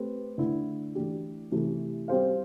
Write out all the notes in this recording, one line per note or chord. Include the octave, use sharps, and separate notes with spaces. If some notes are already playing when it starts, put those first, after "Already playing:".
Already playing: A3 C4 G4 B4
D3 A3 E4
E3 A3 D4 G4
C3 E3 A3
G3 C4 G4 C5 F5